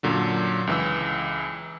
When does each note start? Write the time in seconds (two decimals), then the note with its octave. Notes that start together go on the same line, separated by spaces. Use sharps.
0.03 F#2 A#2 D3 F#3
0.67 C#2 E3 E6